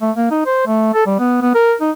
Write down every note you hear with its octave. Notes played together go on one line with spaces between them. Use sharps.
A3
A#3
D#4
C5
A3
A4
G3
B3
B3
A#4
D#4